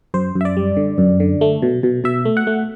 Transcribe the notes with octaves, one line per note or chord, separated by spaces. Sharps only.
F#2 C5
F#2
E5
D5
G3
D3
F#2
D3
A3
B2
B2
B2 E5
A3
F#5
A3